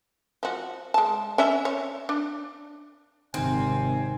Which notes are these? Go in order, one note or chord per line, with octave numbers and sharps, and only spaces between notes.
F3 F#4
G#3 A5
C#4 D4 E5
C#5
D4
G#1 C3 D#3 C4 G#5